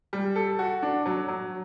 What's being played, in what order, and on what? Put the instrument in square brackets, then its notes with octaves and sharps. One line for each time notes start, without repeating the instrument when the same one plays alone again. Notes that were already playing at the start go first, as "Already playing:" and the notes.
[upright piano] G3
A4
F#4
D4
F#3
F#3